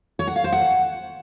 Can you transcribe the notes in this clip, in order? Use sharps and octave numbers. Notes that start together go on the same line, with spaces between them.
C#5
F#5
F5
C5
F#5